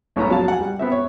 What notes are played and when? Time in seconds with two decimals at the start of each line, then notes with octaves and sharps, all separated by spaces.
0.16 B1 A2 B3 C#4 A#5
0.30 A#1 F#3 F5 A5
0.48 F#5 G#5
0.61 G3
0.79 B3 C4 E5
0.92 C#5